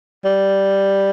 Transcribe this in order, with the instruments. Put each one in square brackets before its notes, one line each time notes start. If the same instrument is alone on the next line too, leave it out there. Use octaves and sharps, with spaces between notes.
[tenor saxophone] G3